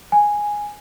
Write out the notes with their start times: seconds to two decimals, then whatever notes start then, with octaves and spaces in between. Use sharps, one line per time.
0.12 G#5